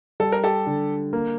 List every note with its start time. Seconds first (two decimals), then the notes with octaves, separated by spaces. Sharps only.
0.20 G3 A4
0.32 A#4
0.44 G4 A4
0.67 D3
1.13 A#3